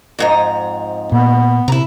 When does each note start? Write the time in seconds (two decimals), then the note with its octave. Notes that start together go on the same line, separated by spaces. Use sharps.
0.19 F2 G#2 A#5
1.12 A#2 B3
1.68 C3 E4 A#5